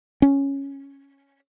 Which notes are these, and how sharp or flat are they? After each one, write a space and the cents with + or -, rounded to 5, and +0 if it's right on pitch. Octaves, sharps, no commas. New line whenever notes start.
C#4 -5